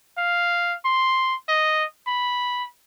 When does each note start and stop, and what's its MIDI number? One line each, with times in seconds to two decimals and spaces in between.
0.18 0.74 77
0.85 1.35 84
1.49 1.84 75
2.07 2.65 83